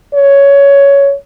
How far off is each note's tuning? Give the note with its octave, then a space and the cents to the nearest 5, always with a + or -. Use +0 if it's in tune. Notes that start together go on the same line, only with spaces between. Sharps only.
C#5 +10